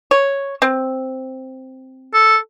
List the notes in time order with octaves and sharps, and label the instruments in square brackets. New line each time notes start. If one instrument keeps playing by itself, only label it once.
[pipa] C#5
C4
[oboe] A4